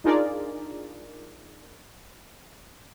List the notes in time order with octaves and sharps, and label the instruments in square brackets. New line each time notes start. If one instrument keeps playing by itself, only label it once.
[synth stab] D4 D#4 F4 G#4 A#4 D5